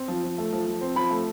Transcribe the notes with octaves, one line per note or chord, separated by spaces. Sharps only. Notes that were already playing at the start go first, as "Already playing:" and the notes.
Already playing: C4
F3
F3
A3
F3
F3
C4
F3 B5
A3